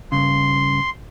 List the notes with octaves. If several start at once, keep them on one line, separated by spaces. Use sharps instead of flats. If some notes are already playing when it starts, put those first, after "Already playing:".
G2 C#3 C6